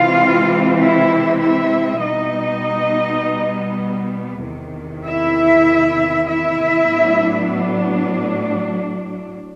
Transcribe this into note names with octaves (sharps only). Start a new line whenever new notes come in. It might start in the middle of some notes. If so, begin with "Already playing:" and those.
Already playing: C3 E3 G#3 C4 F4 F5
E4 E5
E4 E5
B2 G3 B3 D#4 D#5
E2 C3 D#3
E4 E5
E4 E5
A2 F#3 B3 D4